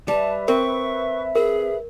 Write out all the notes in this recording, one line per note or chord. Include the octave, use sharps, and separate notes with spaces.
G3 B4 E5 A5
C4 A#4 C#6
G#4 A#4